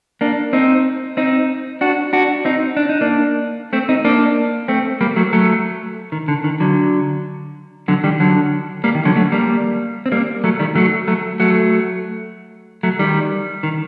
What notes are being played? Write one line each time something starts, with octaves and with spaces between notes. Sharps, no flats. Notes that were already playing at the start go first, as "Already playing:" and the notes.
A#3 D4
C4 D#4
C4 D#4
D4 F#4
D4 F#4
C4 D#4
D4
D#4
A#3 D4
A3 C4
C4 D#4
A#3 D4
A3 C4
G3 A#3
F#3 A3
F#3 A3
D#3
D3
D#3
D3 F#3
D3 F#3
D#3 G3
D3 F#3
G3 A#3
D#3
D3 F#3
F#3 A3
G3 A#3
C4
G3 A#3
F#3 A3
D#3 G3
F#3 A3
F#3 A3
F#3 A3
F#3 A3
D#3 G3
D#3